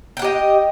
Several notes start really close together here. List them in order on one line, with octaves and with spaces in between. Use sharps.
G5 F#5 G4 D#5